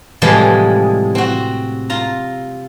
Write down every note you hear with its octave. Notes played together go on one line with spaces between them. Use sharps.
A2 C3 E3 F3 G3 G#3
C4 F#4
F4 A#5